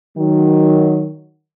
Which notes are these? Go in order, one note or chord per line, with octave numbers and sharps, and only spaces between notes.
D#3 F#3